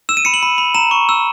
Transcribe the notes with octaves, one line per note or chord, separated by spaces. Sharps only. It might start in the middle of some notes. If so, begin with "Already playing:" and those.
E6 E7
D#7
B5 C#7
F#7
B5
B5
A#5 E7
C#6
E6